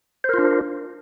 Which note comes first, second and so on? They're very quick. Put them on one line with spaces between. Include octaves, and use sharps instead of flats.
C5 A#4 F4 D4